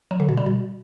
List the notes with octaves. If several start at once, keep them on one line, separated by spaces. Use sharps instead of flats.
F#3
D3
B2
G3
B2